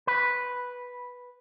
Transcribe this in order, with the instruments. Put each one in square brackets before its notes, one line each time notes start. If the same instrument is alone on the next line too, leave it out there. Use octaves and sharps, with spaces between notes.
[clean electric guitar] B4